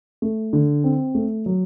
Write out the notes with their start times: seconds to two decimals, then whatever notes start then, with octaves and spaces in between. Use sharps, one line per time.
0.22 A3
0.53 D3
0.84 C4
1.15 A3
1.46 F#3